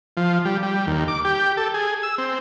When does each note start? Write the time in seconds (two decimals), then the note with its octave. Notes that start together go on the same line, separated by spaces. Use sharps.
0.17 F3
0.45 G3
0.63 G3
0.87 D#2
1.08 D6
1.25 G4
1.57 A4
1.74 G#4
2.03 E6
2.18 C4